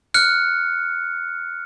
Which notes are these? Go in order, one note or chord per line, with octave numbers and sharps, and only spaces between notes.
F6 F#6 C#7